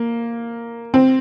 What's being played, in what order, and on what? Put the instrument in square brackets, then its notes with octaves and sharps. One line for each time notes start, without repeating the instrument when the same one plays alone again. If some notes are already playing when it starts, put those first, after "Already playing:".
Already playing: [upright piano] A#3
C4